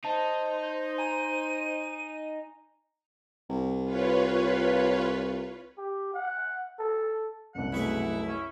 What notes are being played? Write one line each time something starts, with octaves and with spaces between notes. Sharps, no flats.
D#4 C5 A5
G#5 A#5 D#7
C2
F4 B4 C#5
G4
F#5
A4
F#1 C2 F#5
B1 A3 E4 G#4
C#4